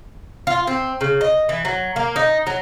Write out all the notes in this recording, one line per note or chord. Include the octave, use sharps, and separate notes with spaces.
F4
C4
C#3
D#5
E3
F#3
A#3
D#4
F#3